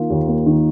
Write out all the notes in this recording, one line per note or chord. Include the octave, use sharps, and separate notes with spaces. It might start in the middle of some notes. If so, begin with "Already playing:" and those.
Already playing: D#3 A#3 F4
D#2
A#3
D#3